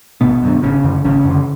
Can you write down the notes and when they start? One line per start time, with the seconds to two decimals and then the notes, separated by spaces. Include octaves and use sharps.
0.21 G#1 B2 B3
0.43 F#2 D3
0.63 G#1 C#3 C#4
0.84 F#2 D3
1.05 G#1 C#3 C#4
1.25 F#2
1.30 D3